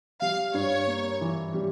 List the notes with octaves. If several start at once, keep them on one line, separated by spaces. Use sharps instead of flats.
G3 F5
G2 C#5
A#3
E3
G3